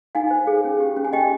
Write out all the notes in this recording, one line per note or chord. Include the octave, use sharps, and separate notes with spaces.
D#4 F5 G#5
C5
G#4
C#4
G4
C#4
G#5
G4 D#5 G5